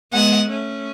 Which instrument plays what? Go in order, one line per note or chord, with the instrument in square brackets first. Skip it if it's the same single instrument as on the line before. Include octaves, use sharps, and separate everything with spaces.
[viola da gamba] G#3 B3 [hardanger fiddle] F#5
[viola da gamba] A3 C#4